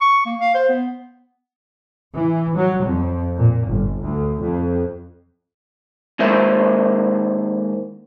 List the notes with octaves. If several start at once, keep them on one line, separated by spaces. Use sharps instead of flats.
C#6
A#3
F5
C5
B3
E3
F#3
F2
A#2
G1
D2
F2
D#2 G#3 A#3 C5 E5